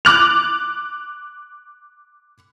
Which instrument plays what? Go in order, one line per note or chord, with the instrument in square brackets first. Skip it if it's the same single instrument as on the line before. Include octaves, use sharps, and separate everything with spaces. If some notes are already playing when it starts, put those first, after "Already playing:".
[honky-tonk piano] D6 F#6 F7